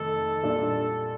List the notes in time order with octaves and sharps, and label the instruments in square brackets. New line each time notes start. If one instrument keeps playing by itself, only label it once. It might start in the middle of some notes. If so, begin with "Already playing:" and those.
Already playing: [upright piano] F2 C3 D#3 A3 [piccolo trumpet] A4
[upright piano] A#2 G3 D4